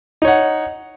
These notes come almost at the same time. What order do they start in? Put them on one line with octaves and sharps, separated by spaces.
D#4 C#5 F#5